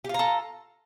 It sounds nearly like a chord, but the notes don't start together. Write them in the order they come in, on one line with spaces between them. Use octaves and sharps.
G4 F4 A#5 A4